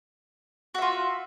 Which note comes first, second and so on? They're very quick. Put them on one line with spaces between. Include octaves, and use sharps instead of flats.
F#4 E5 F4